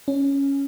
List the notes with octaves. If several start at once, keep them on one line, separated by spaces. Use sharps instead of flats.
C#4